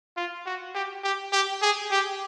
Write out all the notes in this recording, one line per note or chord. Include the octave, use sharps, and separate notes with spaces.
F4
F#4
G4
G4
G4
G#4
G4